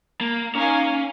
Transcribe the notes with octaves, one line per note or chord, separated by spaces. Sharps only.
A#3
A#3 C#4 D#4 A#4 F5 G#5